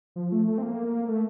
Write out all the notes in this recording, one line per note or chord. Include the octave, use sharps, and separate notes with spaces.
F3
A3
A3
C4
A#3
A3